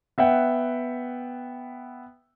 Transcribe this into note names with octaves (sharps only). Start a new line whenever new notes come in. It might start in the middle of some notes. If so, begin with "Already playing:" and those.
B3 E5 F#5 G5